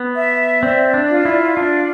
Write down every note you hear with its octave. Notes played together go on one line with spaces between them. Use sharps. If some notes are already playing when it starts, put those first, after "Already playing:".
Already playing: B3
E5
C4 D5
D4
F4
E4
D4 D5